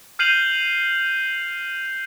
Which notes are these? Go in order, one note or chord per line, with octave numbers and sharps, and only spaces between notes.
F6 G6 C7 D#7 F7 F#7